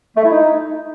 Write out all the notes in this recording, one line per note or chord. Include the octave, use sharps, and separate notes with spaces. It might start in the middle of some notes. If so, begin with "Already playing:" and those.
A3
E4
D#4